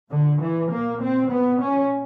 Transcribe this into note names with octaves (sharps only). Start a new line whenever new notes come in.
A#2 D3
E3
A#2 A#3
C4
A#2 B3
C#4